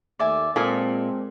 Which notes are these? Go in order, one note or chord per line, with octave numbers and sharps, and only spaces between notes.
D#2 A3 D5 E5 G#5
A#2 G#3 C4 A4 D#5 G#5